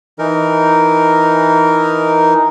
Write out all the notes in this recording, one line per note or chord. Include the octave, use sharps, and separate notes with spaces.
E3 D#4 A#4